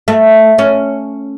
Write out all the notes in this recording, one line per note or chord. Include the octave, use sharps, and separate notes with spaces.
A3
C#4